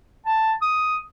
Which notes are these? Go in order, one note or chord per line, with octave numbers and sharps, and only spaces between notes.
A5
D#6